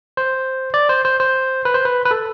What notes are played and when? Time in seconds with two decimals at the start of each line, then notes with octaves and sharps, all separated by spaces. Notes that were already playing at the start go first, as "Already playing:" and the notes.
0.17 C5
0.74 D5
0.89 C5
1.05 C5
1.20 C5
1.65 B4
1.74 C5
1.85 B4
2.05 B4
2.11 A4